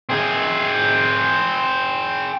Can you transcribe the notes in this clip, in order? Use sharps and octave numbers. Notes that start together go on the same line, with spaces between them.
C4 G#4